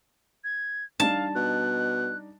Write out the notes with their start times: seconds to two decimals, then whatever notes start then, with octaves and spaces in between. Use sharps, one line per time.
0.44 G#6
1.00 G3 D4 D#4 F5 A5
1.35 B2 F#6